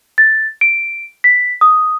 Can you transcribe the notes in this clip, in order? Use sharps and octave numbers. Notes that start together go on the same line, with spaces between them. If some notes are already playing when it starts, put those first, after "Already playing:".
A6
D7
B6
D#6